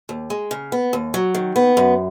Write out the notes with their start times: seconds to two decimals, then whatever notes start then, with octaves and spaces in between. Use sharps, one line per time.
0.09 D#2
0.30 G#3
0.51 C#3
0.72 B3
0.93 D#2
1.14 F#3
1.35 D#3
1.56 B3
1.77 F#2